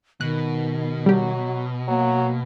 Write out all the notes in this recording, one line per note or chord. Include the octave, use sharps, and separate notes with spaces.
B2 D#3 F#6
F#3 G3 G4
F#3 A#3